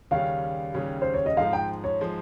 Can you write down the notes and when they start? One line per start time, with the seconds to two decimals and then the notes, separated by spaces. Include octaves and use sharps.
0.11 D#2 C#3 G3 C#4 F5
0.74 D#2 C#3 G3 C#4
1.02 C5
1.14 C#5
1.26 D#5
1.37 G#2 F3 G#3 F5
1.53 G5
1.84 C#5
2.01 F3 G#3